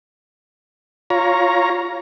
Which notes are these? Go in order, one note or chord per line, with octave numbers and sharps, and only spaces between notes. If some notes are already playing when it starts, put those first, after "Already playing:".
F4 C#5 A#5